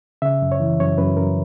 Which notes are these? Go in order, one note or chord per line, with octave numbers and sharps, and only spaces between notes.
C#3 E5
F#2
C#5
E3
F#2 C#5
F#2 B4
F#2 A#4